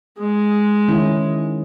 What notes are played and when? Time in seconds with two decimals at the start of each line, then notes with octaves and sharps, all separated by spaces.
0.19 G#3
0.88 D#3 C#4 E4